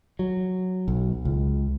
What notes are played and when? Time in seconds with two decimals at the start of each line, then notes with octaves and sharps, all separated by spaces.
0.19 F#3
0.88 B1
1.25 C#2